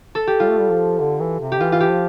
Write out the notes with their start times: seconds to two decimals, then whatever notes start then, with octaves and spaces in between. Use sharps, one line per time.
0.15 A4
0.27 G4
0.40 G3 F4
0.49 A3
0.60 G3
0.71 F3
1.01 D3
1.20 E3
1.40 C3
1.52 G4
1.60 E3 F4
1.72 F4
1.80 G4
1.90 F3